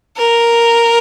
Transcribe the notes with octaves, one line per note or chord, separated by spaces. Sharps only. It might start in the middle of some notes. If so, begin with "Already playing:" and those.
A#4